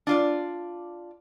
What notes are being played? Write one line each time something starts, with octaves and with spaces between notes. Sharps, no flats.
D4 F4 D5